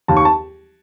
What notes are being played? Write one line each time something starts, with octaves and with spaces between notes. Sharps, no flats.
D#2 A5
C#6
A5